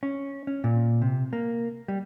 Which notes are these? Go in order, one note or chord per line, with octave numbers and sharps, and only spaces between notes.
C#4
C#4
A#2
C3
A#3
G3